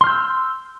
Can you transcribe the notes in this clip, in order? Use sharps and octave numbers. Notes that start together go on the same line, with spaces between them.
C6 E6 F6 G6